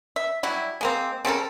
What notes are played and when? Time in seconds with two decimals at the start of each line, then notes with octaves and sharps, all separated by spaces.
0.16 E5
0.43 F#3 G3 E4
0.81 G#3 A#3 C4
1.25 C#3 C4 A4 A#4